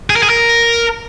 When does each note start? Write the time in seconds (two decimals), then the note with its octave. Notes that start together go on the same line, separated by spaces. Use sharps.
0.10 G#4
0.16 A#4
0.23 G#4
0.30 A#4